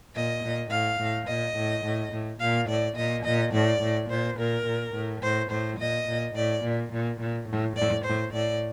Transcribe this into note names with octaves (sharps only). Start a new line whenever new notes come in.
A#2 D#5
A#2
A2 F5
A2
A#2 D#5
A2
A2
A2
A#2 F5
A2 D5
A#2 D#5
A#2 D#5
A2 D5
A2
A#2 C5
A#2 A#4
A#2
A2
A2 C5
A2 C5
A#2 D#5
A#2
A2 D5
A#2
A#2
A#2
A2
A2 D5
A2 C5
A2 D5